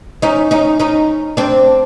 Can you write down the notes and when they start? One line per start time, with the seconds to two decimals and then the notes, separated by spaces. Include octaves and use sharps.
0.22 C#4 D#4
0.51 C#4 D#4
0.80 C#4 D#4
1.37 C4 D4